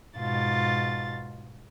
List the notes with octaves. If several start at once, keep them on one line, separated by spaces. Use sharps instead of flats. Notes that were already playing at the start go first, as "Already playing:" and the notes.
G#2 B2 F4 A6